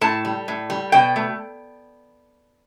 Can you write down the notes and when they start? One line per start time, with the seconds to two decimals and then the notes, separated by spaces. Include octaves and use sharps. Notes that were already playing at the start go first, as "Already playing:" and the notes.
0.01 A2 A5
0.25 G3
0.48 A2
0.70 G3
0.92 B2 G5
1.16 A3